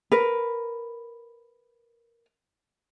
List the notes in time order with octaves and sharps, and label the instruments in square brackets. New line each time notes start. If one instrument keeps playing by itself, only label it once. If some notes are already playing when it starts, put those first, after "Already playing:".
[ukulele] A#4 B4